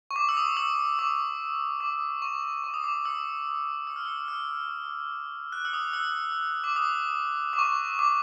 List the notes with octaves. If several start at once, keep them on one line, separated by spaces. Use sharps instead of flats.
C#6
D6
E6
D#6
E6
D6
D6
C#6
C#6
D#6
D6
E6
E6
F6
E6
F6
F#6
E6
D#6
E6
D6
D#6
D6
C#6
D6